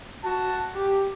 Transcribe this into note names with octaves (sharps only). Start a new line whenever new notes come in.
F#4 A5
G4